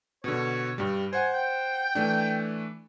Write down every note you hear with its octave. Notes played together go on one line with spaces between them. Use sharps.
B2 D3 C#5
G2 G3
C5 F#5 G#5
G5
E3 A3 D4